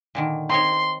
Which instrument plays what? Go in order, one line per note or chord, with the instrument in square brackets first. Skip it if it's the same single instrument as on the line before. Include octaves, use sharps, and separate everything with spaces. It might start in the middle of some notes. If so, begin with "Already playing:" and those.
[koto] A#2 D3 D#3
[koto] C4 D#4 C#5 [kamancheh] C6